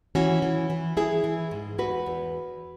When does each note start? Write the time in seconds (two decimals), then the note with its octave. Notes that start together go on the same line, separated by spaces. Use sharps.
0.15 E3 C#4 F#4
0.42 E3
0.70 E3
0.97 E3 E4 G#4
1.24 E3
1.51 G#2
1.78 E2 F#4 B4
2.06 E2